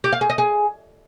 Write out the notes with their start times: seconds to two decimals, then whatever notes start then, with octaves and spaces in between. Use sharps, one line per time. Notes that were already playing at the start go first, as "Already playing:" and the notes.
0.04 G4
0.13 F5
0.21 G#4
0.30 D#5
0.38 G#4